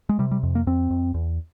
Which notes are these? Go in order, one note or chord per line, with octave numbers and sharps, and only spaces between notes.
G#3
C3 G3
G3
F2
A#3
F2 C4
F2
E2